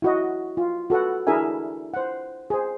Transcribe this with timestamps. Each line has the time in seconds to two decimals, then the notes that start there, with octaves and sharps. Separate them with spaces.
0.02 E4 F#4 D#5
0.57 F4
0.90 F#4 A4 B4 F#5
1.27 D4 E4 G#4 A#4 E5 G#5
1.94 C5 F#5
2.50 G#4 C5